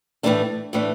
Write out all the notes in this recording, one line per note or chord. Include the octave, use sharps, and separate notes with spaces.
A2 E3 A3 D4
A2 E3 A3 D4